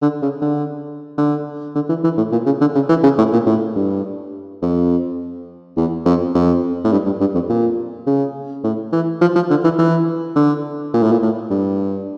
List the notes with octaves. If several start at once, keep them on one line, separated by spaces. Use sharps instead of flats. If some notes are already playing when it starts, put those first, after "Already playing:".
D3
C#3
D3
D3
D3
E3
E3
A2
A#2
C#3
D3
C#3
E3
C#3
A2
A#2
A2
G2
F2
E2
F2
F2
A2
G2
G2
G2
F2
A#2
C#3
A2
E3
F3
F3
D3
E3
E3
D3
A#2
A2
A#2
A2
G2